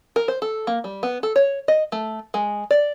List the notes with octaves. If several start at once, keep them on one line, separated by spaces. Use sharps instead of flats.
A#4
C5
A4
A#3
G3
B3
A4
C#5
D#5
A3
G#3
D5